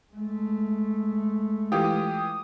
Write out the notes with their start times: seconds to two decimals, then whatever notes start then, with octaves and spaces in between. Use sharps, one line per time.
0.13 G#3 A3
1.72 E3 F4 G4 D#6